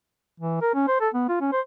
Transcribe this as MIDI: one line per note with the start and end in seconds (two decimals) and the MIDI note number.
0.40 0.58 52
0.62 0.69 70
0.74 0.86 61
0.88 0.98 72
1.01 1.09 69
1.14 1.24 59
1.29 1.36 65
1.40 1.50 61
1.52 1.61 72